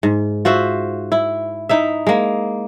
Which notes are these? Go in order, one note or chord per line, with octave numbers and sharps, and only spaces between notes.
G#2
F4 F#4 C5 E5
E4
D#4 E4 E5
G#3 A#3